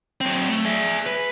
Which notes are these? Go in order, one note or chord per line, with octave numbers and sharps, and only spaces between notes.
F#3 C4
A3
G#4 E5
B4